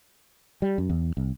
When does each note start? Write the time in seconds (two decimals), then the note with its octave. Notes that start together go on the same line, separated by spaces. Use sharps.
0.62 G3
0.78 F#2
0.90 E2
1.17 C2